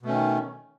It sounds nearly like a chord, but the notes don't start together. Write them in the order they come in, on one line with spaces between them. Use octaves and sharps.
B2 A3 C#4 D#3